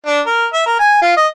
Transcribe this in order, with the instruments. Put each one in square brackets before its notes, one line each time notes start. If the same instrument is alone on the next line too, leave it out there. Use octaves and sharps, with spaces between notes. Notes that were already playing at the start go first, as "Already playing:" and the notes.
[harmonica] D4
A#4
E5
A#4
G#5
F4
D#5